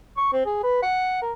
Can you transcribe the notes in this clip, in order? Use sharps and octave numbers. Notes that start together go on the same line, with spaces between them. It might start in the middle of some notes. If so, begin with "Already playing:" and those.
C#6
C4
G#4
B4
F#5
A#4